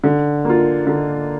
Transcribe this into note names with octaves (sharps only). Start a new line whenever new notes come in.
D3
A#3 F4
D3